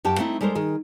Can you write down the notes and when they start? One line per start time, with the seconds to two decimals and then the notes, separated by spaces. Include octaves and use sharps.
0.04 F#2 G4 G5 A5
0.18 A3 C4 D#4 E4
0.41 G3 G#3 A4 A#4 C5
0.55 D#3 G#4